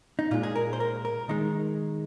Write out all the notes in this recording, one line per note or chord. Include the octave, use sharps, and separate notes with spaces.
D#4
A#2 G#3 F4
G#4
A#4
C5
A#4
A#4
D#3 G#3 D#4